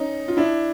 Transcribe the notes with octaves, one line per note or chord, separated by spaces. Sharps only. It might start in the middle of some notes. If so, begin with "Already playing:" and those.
Already playing: C#4 D#4
F4
D4 E4